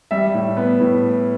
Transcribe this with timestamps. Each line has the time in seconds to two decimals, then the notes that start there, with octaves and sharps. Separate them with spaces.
0.11 G3 E5
0.34 A2
0.57 B3
0.80 A2